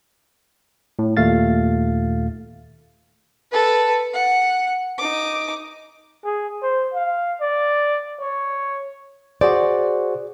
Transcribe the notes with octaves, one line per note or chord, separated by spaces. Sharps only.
A2
D#2 A#2 A3 F5 A6
A4 B4
F#5
D#4 D6
G#4
C5
F5
D5
C#5
F#4 G#4 C5 D5